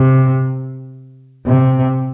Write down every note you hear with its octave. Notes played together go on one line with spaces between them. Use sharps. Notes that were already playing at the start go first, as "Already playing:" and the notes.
Already playing: C3
C3